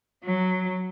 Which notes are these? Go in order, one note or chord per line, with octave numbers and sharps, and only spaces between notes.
F#3